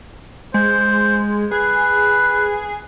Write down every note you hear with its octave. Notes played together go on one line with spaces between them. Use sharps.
G#3 C5
G#4 B4